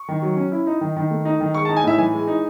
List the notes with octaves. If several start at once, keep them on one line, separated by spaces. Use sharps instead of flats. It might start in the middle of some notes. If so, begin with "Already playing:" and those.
Already playing: C#6
D#3
F#3
C#4
E4
D#4
D#3
D#3
A3
D#4
D#3
G#3 C#6
A5
D#4
G#5
A2 E5
E3 G#5
G#3
D#4